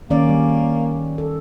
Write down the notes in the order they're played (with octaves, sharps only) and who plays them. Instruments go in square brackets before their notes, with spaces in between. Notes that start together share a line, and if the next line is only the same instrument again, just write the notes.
[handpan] D#3 C#4 D5 [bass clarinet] A#3
[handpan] G3
A4